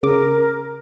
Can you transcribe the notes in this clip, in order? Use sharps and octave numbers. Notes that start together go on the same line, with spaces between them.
C#3 A#4 D6